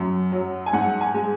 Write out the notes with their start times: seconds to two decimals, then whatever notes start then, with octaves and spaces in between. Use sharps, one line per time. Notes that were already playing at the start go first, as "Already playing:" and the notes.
Already playing: F#2
0.32 F#3
0.66 G#5
0.73 G#2 F#5
1.01 G#5
1.14 G#3